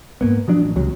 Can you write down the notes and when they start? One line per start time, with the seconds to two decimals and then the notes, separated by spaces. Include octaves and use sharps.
0.21 G#2 A#3 B3
0.48 F3 F#3 D4
0.62 A1
0.76 C#2 C3 F#3